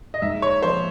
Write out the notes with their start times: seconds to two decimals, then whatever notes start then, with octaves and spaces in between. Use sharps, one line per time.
0.14 D#5
0.22 G#2 E5
0.42 C#5
0.63 F3 C5